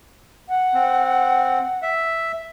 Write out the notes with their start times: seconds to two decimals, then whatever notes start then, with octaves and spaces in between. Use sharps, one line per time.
0.48 F#5
0.74 C4
1.82 E5